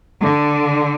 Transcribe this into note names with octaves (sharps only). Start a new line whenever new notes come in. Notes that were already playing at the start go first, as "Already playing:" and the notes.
D3